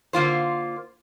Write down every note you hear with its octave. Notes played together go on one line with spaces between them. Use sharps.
D3 A#3 F4 C5